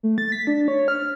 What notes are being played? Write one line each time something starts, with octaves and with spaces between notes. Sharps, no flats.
A3
A6
B6
D4
C#5
F6